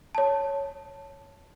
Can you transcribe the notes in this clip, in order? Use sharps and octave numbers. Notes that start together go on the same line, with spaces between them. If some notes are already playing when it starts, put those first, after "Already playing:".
C#5 A5